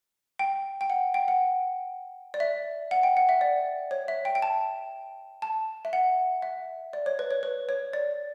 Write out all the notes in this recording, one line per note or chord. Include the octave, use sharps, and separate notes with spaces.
G5
G5
F#5
G5
F#5
D5
E5
F#5
G5
F#5
E5
D5
C#5
E5
G5
G5
A5
A5
E5
F#5
E5
D5
C#5
B4
C#5
B4
C#5
D5